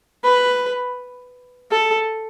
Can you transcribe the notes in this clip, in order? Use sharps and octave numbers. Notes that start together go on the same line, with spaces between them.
B4
A4